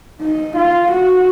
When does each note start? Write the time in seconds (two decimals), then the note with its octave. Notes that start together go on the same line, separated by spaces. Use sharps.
0.21 D#4
0.56 F4
0.91 F#4